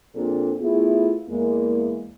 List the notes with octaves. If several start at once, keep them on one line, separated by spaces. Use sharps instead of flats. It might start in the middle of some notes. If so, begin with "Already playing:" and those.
A#2 F3 C4 D4 G#4 A4
A3 B3 E4 F4 G#4
E2 G#3 A#3